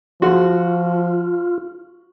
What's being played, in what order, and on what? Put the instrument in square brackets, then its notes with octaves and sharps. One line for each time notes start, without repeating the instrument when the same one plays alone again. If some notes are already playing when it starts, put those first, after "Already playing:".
[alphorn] F3 [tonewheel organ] F4 [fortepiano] F#4